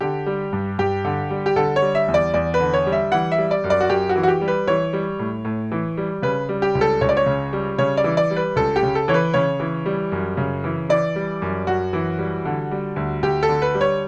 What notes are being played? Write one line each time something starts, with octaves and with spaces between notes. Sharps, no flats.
D3 G4
G3
G2
G2 G4
D3
G3
G4
D3 A4
C#5
G3
E5
E2
D5
E2 D5
B4
D3
C#5
G3
E5
E3 F#5
E5
G3
D5
F#2
D5
F#4
F#2 G4
F#4
E3
F#4
G4
G3
B4
E3 C#5
G3
A2
A2
E3
G3
C#3 B4
G3
G4
C#2
A4
C#2 C#5
D5
C#5
C#3
G3
C#3 C#5
D5
E3
D5
G3
B4
C#2 A4
G4
C#3
A4
E3 C#5
B4
C#3 C#5
E3
G3
F#2
C#3
E3
E3 D5
G3
F#2
F#2 F#4
E3
G3
D3
G3
D2
D2 G4
A4
D3
B4
G3
C#5